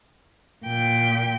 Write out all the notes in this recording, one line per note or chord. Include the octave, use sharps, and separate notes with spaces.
A#2 G5